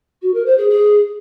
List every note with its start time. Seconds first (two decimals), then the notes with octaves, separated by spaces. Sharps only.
0.22 F#4
0.34 A#4
0.46 C5
0.58 G#4
0.70 G#4